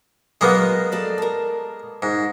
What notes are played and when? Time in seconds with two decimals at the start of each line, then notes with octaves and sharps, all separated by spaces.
0.41 F#3 G#3 A#3 B3 B4
0.92 A4 D5 A5
1.18 A#4 A5
2.02 G#2